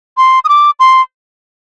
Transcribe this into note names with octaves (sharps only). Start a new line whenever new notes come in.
C6
D#6
D6
C6